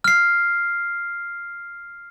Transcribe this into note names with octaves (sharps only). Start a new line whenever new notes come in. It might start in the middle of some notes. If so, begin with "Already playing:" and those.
F6 C7